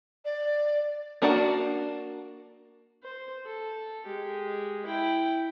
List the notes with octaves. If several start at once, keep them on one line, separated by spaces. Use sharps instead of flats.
D5
A#3 D4 F#4 D5 F#5
C5
A4
G#3 G4
E4 G5